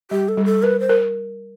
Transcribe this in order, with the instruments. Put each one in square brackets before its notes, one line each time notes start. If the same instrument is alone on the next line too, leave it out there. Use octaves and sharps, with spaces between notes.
[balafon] G3 [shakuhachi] G4
[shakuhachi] A4
[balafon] G3
[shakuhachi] A4
[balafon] A#4 [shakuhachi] B4
[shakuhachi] C5
[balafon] A#4